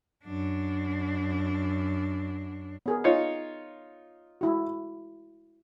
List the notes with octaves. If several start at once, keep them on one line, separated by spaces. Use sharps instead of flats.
F#2 D4
B3 G#4 A#4
D#4 F4 C#5
G#3 E4 F#4